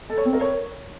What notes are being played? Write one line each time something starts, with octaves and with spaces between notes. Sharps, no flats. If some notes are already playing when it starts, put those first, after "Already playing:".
A4
C#5
C4
A#4
C#5